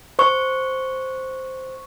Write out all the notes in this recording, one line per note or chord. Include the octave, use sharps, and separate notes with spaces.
C5 C#6